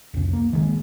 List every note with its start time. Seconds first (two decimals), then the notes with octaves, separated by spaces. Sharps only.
0.14 C2 F2
0.33 A#3
0.53 D#3 G#3